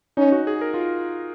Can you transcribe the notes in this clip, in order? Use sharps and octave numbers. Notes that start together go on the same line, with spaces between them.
C#4 D#4
F#4
G#4
A#4
F4